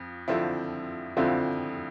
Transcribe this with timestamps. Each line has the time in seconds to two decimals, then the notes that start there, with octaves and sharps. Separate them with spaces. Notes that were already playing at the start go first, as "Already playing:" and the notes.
Already playing: F2 F3
0.28 F2 D3 F3 C4 E4
1.17 F2 D3 F3 C4 E4